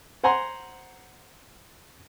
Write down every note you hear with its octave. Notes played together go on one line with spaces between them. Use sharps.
C5 F#5 G#5 A#5 C6